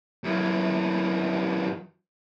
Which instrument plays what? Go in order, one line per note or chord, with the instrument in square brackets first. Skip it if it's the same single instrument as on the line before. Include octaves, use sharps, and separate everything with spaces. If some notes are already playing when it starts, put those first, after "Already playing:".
[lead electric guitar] F#2 E3